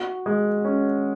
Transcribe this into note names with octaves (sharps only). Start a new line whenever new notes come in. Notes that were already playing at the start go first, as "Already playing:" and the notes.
Already playing: F#4
G#3
C#4